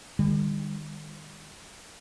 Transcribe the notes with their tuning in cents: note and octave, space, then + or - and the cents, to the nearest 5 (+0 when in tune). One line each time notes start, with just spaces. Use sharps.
D#3 -30 G3 +40